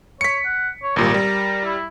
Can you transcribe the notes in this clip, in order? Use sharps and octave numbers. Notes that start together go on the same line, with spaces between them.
C#5 B6 C#7
F#5
C#5
G#1 A#2 G3 A#4
G3
E4